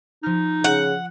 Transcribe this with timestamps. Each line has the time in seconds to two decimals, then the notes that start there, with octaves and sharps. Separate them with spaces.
0.23 F3 D#4 F6
0.64 C#3 F#5